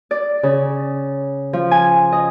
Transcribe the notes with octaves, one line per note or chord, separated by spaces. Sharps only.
D5
C#3
F3
G#5
D#5